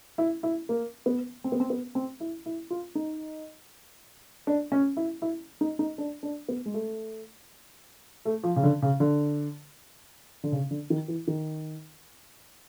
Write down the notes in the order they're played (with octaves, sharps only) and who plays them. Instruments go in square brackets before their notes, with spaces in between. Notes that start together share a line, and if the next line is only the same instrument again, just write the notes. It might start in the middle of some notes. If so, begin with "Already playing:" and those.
[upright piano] E4
E4
A#3
B3
C4
B3
C4
B3
C4
E4
E4
F4
D#4
D4
C#4
E4
E4
D#4
D#4
D4
D4
B3
G#3
A3
A3
F3
C#3
D3
C#3
D3
D3
C#3
D3
D#3
E3
D#3